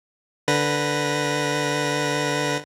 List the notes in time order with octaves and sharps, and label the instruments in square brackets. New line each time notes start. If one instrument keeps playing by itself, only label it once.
[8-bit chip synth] D3 B4 A#6